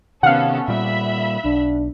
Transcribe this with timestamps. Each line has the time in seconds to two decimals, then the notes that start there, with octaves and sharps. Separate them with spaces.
0.23 C3 D#3 B3 C#4 A4 F5 F#5
0.68 A#2 G3 E5 B5
1.45 B1 D4